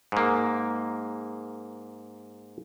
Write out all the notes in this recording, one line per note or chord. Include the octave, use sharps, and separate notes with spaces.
G#2 A#3